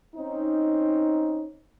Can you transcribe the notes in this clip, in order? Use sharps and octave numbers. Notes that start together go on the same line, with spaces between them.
C4 C#4 D#4